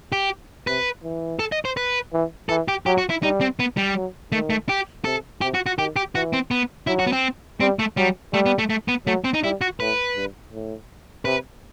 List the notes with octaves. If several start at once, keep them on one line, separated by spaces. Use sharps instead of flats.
G4
C3 B4
E3
A4
D#5
C5
B4
E3
E3 A4
G4
F#3 G4
F#4
E4
G3 D#4
C4
B3
G3
F#3
D#3 A3
A3
G4
C3 A4
C3 G4
F#4
F#4
D#3 G4
G4
E3 F#4
C4
B3
F#3 E4
F#4
B3
C4
G3 C4
A3
F#3 G3
G3 A3
B3
A3
A3
B3
F#3 A3
C4
D#4
G3 E4
F#4
A2 B4
G2
A2
C3 B4